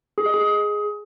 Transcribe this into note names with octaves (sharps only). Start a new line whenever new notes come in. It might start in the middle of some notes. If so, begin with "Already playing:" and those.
G#4
D#5
G#4